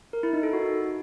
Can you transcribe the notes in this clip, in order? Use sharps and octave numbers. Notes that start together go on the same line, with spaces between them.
A#4
E4
D#4
A4
F#4